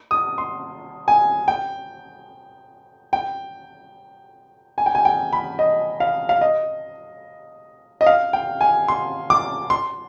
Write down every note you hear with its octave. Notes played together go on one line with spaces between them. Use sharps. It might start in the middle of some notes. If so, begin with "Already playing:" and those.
D#6
C6
G#5
G5
G5
G#5
G5
G#5
G5
B5
D#5
F5
F5
D#5
D#5
F5
G5
G#5
C6
D6
C6